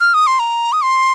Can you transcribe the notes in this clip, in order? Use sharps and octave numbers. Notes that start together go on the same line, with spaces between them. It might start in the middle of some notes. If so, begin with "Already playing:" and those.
F6
D#6
C6
A#5
D#6
C6